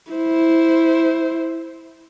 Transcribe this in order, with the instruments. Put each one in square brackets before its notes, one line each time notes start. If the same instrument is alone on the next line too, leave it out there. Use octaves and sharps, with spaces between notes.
[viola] E4 C5